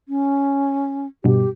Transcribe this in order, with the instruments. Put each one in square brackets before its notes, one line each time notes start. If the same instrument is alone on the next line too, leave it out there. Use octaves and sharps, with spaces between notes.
[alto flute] C#4
[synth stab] G2 B2 [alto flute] G4